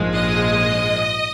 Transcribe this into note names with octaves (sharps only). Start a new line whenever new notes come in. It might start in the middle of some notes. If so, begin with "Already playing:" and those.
Already playing: A#1 G#2 F3 G#3
D#5